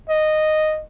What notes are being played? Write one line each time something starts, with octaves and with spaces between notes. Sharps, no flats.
D#5